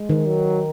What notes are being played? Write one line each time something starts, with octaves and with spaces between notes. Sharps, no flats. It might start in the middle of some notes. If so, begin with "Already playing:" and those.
Already playing: G#3
D#3
F#3